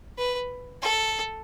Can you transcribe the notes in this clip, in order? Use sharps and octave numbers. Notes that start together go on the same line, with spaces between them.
B4
A4